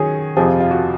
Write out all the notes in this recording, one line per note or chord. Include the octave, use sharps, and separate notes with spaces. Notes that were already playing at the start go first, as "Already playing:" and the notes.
Already playing: D#3 F#3 C#4 G#4
F2 C3 F3 G#4
F4
F4
F#4